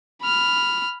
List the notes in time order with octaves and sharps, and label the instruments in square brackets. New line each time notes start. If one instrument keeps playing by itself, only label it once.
[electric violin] B5 F6